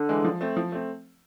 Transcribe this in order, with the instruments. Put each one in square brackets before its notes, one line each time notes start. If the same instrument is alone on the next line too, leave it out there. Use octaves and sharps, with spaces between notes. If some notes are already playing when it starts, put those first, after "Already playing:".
Already playing: [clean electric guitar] D3
[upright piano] E3 G#3
F3
A3 C4
F3
A3 C4